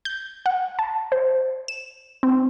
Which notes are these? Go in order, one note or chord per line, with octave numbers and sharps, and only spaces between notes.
G6
F#5
A5
C5
E7
C4